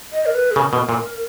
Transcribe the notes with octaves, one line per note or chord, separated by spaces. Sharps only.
D#5
A#4
B4
G#4
C#3 A#4
B2
A#2